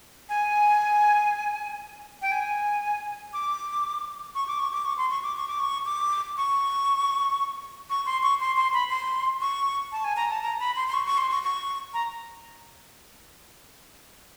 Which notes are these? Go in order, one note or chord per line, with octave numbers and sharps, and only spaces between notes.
G#5
G5
G#5
D6
C#6
D6
C#6
D6
C#6
C6
C#6
D6
C#6
D6
C#6
D6
C#6
C#6
C6
C#6
C6
C6
B5
C6
C#6
A5
G#5
A#5
A5
A#5
B5
C6
C6
C#6
C#6
C6
C#6
C#6
A#5